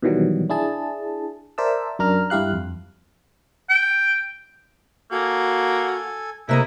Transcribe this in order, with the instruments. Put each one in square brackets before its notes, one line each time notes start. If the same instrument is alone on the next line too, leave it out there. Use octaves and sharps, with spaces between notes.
[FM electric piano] B2 D#3 E3 F#3 G3
D4 E4 G#4 A5
A#4 C5 D5 E5 A5 E6
F#2 D4 A#4 A#5 F6
G2 E4 G4 F5 F#6
F2
[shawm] G5
[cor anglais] A#3 [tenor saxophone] F#4 [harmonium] A4 G#5
[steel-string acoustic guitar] C3 A#3 D#5 [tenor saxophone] A3 [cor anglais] E4